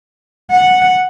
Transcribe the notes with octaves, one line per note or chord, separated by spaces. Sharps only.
F#5